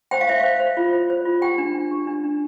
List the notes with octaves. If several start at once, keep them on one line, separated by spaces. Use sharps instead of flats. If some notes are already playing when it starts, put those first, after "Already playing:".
C5 G5
F5
C5 E5
C5 F5
C5
F4
C5
C5
F4
G4 G5
D4
D4
G4
D4
D4